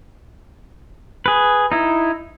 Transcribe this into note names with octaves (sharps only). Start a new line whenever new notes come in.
G#4 B4
D#4 E4